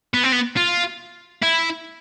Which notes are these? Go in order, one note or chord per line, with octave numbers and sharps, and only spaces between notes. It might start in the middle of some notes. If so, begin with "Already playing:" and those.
B3
C4
B3
F4
E4